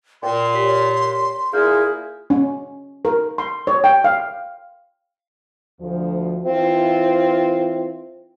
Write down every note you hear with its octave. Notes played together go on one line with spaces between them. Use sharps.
A#2 G5 C6
G4 C#5 B6
A#2 A#3 E4 G#4 E5 F6 G6
C#4
A#4
C6
C#5
G5
F5
D2 F3
E3 C4 E4 F4